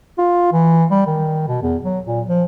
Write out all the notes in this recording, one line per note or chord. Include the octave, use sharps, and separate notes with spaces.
F4
E3
G3
D#3
B2
E2
F#3
A#2
F3